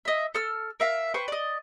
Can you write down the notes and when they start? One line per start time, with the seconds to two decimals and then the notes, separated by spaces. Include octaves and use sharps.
0.05 D#5 E5
0.35 A4 E6 F6
0.80 A#4 E5 F5
1.14 B4 C5 G5 C#6
1.28 D5 D#5